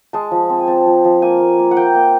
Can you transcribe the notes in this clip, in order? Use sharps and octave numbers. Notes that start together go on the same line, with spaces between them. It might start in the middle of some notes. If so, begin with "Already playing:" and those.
G#3 A5
F3
C4
G#5
C4 A5
F3
F3
A#3 G#5
A#3
A#3
F#5
A#3 G5
A#3